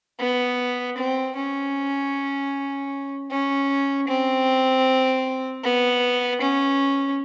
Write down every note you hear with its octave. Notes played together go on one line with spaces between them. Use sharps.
B3
C4
C#4
C#4
C4
B3
C#4